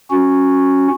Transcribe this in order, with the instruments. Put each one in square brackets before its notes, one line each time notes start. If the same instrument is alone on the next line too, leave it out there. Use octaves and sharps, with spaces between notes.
[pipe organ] C#4 F#4